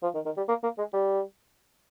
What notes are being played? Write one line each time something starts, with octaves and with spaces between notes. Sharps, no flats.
F3
D#3
D#3
G3
A#3
A#3
G#3
G3